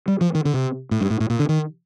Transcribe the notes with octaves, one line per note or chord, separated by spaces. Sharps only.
G3
F3
D#3
D3
C3
A2
G2
A2
A2
A#2
D3
D#3